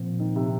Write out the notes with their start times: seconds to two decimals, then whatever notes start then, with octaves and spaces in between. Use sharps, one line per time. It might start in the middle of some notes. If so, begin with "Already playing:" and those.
Already playing: A#2 F3 C4
0.20 D#3
0.36 C3